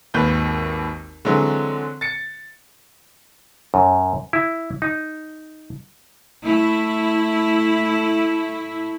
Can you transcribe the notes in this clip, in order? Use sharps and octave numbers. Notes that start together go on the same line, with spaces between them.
G#1 D#2 B4 G6
D3 E3 F#3 G#3 C4
A6 C#7
F#2
E4
D#4
A3 E4